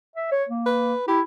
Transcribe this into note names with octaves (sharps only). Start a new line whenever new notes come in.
E5
C#5
A#3
B4
E4 G4